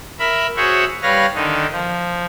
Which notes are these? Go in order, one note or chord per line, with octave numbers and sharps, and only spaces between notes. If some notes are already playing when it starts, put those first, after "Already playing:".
A#4 E5 B5
F#4 G#4 C5 C#5 E5 F#5
G3 B4 C#5 F5 A#6
D3 D#3 D#4
F3